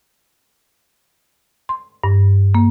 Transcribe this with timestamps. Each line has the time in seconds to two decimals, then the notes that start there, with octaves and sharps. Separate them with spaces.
1.69 C6
2.04 G2
2.55 A#3